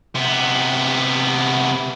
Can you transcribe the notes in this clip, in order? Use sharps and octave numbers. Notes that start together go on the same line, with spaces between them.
C3 B3